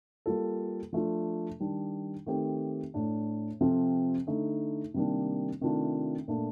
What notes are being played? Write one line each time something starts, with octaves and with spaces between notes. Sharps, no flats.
G3 A#3 F4 A4
F3 A3 D4 F4
D#3 G3 D4
D#3 A3 C4 G4
A2 A3 D4
C3 F3 C4 F4 A4
D3 A3 D#4
C3 D#3 G3 A#3 D4
C3 D#3 A3 D4 F4
A#2 A3 D4